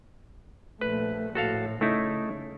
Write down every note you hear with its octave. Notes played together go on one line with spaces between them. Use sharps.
A#1 A3 B4
A#1 A2 F#4 A4 F5
C#3 A3 D#4 E4